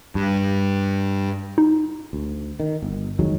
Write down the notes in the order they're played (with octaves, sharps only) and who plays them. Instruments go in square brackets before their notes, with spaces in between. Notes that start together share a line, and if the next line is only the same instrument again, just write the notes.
[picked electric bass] G2
[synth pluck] D#4
[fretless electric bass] D2
D#3
G1
F2 D#3 F#3 G#3